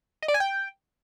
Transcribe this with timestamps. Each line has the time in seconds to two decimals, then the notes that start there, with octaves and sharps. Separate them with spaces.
0.22 D#5
0.28 D5
0.34 G#5
0.40 G5